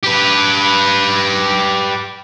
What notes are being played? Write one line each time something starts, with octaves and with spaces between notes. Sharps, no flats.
G4 B4